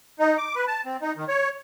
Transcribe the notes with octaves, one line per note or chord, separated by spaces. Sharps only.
D#4
D6
B4
A5
C4
D#4
D#3
C#5